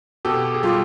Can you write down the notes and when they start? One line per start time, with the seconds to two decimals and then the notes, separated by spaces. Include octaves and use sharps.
0.25 B2 G4 A4
0.54 G#4
0.63 G3 F4 G4